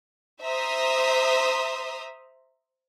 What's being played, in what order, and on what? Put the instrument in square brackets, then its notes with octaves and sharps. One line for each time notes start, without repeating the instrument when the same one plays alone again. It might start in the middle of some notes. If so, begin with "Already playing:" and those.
[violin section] C5 E5 A#5 C6 D#6